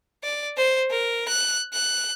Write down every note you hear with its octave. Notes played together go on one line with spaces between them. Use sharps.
D5
C5
A#4
F#6
F#6